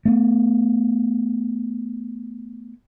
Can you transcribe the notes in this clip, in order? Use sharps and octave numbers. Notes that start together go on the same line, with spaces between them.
A3 B3